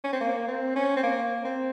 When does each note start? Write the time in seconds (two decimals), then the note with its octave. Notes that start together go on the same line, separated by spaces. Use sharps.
0.04 C#4
0.13 C4
0.20 A#3
0.48 C4
0.76 C#4
0.96 C4
1.03 A#3
1.45 C4